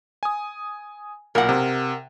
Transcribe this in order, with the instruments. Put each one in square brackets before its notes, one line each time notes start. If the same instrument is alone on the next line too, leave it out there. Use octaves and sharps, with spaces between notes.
[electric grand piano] G#5 D#6
[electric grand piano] B1 A#2 [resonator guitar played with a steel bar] A#4 F#5
[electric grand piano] C3